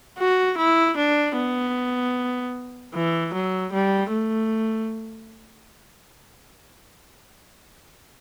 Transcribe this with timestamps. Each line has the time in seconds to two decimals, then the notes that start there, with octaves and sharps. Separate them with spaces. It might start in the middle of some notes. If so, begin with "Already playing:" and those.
0.18 F#4
0.58 E4
0.97 D4
1.37 B3
2.94 E3
3.33 F#3
3.73 G3
4.12 A3